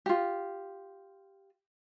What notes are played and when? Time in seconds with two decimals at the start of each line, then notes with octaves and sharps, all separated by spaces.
0.06 F4 G4